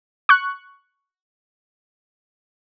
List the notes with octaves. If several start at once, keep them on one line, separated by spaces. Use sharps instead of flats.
C#6 F#6